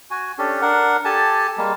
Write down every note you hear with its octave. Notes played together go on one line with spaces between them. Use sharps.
F#4 G#5
C#4 D4 G4 A4
D4 A#4 F#5
G4 A4 G#5 A5
G3 G#3 A#3